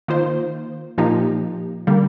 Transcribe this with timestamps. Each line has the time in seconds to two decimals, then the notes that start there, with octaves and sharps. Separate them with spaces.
0.08 D#3 A#3 F4 C5
0.98 A#2 F3 A#3 D#4 G4
1.87 D3 G3 A#3